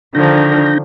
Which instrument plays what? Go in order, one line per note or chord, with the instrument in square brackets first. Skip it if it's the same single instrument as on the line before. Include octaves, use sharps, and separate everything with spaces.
[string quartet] D3 D#3 F3 [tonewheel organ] D4 G6 A#6